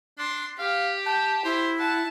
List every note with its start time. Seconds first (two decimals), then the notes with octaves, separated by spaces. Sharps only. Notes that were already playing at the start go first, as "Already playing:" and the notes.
0.18 D4 C6
0.59 G4 F5
1.06 G5 A5
1.45 E4 C5
1.79 F#5 A5